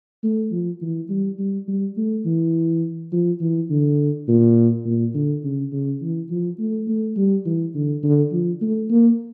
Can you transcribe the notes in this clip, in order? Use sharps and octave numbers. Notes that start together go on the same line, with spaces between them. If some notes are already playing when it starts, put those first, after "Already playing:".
A3
F3
E3
G3
G3
G3
A3
E3
F3
E3
D3
A#2
A#2
D3
C#3
C#3
E3
F3
A3
A3
G3
E3
D3
D3
F3
A3
A#3